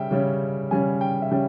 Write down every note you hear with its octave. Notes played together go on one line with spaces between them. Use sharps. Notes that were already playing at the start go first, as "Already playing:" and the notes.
Already playing: C#3 G3 E5 G5
C#3 G3 C#4
C#3 G3 C#4 G#5
G5
E5
C#3 G3 C#4 G5